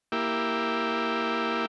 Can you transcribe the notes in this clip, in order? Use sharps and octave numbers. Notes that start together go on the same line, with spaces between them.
A#3 E4 G4